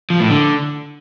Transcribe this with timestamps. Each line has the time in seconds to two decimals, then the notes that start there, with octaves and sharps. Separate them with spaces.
0.10 F3
0.20 A2
0.30 D3